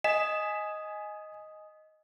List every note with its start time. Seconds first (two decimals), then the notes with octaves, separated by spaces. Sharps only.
0.04 D#5 G#5 B6 E7